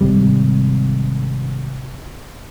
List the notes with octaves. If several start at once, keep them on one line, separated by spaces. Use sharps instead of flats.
G#1 C3 G3